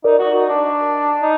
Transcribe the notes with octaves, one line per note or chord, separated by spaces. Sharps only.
D#4 A#4 D5
F#4
D#4
D4
D#4